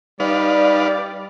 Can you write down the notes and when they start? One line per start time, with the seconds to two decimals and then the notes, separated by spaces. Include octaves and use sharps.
0.20 G3 D#4 B4 D5 F5